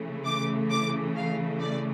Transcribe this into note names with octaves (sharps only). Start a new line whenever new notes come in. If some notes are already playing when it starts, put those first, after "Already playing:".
Already playing: C#3 E3 A3
D6
D6
F5
D5